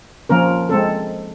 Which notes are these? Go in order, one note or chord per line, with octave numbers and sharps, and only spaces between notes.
F3 A#3 C#4 A#4
G#3 C4 A4